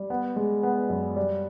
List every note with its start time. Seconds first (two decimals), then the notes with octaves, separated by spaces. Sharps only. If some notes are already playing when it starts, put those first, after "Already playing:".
Already playing: G3
0.10 B3
0.36 G#3
0.63 B3
0.89 F#2
1.16 G3